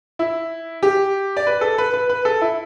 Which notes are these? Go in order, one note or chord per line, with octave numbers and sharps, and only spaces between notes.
E4
G4
D5
B4
A4
B4
B4
B4
A4
E4